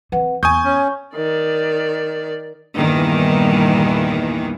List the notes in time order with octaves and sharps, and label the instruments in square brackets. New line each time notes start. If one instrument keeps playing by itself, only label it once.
[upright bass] E3 C4 [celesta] B4 F#5
[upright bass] E2 [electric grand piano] G#5 D#6 G6 [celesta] C#6
[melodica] C#4
[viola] D#3 D5
[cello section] E2 G2 A#2 D#3 E3